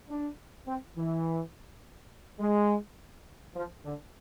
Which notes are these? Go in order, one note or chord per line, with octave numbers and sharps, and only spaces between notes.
D4
C4
E3
G#3
F3
D3